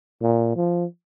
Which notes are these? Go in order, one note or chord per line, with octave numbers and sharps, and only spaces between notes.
A#2
F3